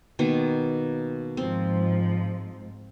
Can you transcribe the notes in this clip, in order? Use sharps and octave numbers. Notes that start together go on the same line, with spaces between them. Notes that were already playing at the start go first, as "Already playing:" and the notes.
B2 D#3 A#3
G#2 F3 C4